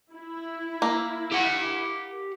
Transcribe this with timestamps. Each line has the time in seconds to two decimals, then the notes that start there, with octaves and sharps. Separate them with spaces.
0.12 E4
0.82 A#3
1.32 G4 F#5